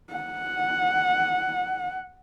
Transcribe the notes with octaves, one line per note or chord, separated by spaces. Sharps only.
F#5